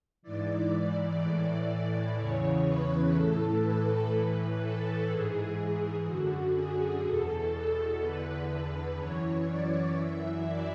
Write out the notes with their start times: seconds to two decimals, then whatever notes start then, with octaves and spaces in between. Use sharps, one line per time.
0.22 G#2 E3 D5
1.20 A2 E3 D5
2.17 E2 C#3 E3 C#5
2.65 B4
3.14 A2 E3 A4
3.63 B4
4.11 A2 E3
4.60 A4
5.09 G#2 E3 G#4
6.06 F#2 D3 F#4
6.55 G#4
7.03 E2 B2 A4
7.52 A4
8.01 E2 D3 B4
8.98 F#2 E3 C#5
9.47 D5
9.95 F#2 E3 E5
10.44 D5